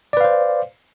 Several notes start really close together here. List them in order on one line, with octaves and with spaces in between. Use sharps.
D5 B4 F5 C5